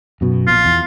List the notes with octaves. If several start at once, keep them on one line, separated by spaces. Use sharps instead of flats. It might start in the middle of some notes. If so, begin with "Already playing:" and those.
F#2 B2
A#1 F4
E2